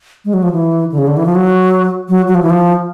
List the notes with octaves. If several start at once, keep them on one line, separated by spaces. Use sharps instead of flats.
G#3
F#3
F3
E3
D3
C#3
D3
E3
F3
F#3
F#3
F#3
F3
E3
F3